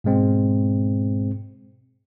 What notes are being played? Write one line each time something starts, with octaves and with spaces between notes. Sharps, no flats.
G#2 B2 G#3 C4